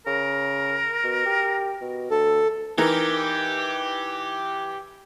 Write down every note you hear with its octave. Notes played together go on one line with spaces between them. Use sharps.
C#3 A#4
B2
G4
B2
D2 A4
E3 D#4 G4 A#4